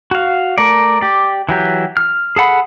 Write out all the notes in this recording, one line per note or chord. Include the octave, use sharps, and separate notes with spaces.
F#4 F5
A3 A#4 D5
G4 D5
E3 F#3 G4
F6
G#4 A4 F#5 B5